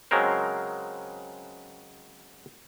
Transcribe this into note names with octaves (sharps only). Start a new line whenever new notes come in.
C#3 F#3 G#3 C4 A#4 C5